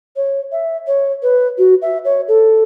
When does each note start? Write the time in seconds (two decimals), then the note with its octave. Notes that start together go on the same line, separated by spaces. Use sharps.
0.16 C#5
0.52 E5
0.87 C#5
1.23 B4
1.58 F#4
1.82 E5
2.05 C#5
2.28 A4